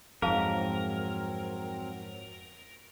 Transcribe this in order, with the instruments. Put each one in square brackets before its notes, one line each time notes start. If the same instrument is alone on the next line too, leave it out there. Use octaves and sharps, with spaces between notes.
[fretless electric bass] F2 G#2 [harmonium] F#3 C4 [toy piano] G#4 F5 A5 [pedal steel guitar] A#4